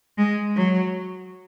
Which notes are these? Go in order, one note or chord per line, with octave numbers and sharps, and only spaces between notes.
G#3
F#3